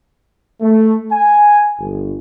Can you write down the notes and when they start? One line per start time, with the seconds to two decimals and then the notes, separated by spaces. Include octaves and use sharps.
0.61 A3
1.11 G#5
1.78 G1